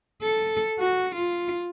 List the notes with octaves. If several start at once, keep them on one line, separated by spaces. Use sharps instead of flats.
A4
F#4
F4